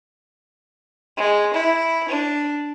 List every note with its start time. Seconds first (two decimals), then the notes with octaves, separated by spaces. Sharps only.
1.18 G#3
1.54 E4
2.09 D4